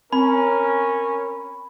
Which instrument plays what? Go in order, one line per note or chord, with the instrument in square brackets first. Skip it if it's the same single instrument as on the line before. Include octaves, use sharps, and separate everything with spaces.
[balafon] C4 [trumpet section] C#4 [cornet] A#4 [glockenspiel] B5